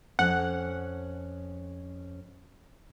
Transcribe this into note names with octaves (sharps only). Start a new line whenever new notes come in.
F2 C#4 F#5